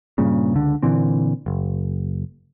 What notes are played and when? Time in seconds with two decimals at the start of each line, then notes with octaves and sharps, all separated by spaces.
0.18 G2 A#2 C#3
0.54 C#2 D3
0.83 A#2 D3 E3 C4
1.46 F#1